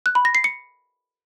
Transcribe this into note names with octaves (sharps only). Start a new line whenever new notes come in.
F#6
B5
A#6
C7
C#7